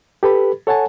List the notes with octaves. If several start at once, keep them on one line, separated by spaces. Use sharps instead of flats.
G4 A4 B4 B5
A4 C#5 F#5 G#5 A5